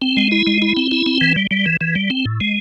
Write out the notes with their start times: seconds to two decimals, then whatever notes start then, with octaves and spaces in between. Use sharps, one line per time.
0.02 C4
0.17 G#3
0.32 E4
0.47 G#3
0.62 E4
0.77 C4
0.91 E4
1.06 C4
1.21 E3
1.36 G3
1.51 G3
1.66 E3
1.81 E3
1.95 G3
2.10 C4
2.25 A2
2.41 G#3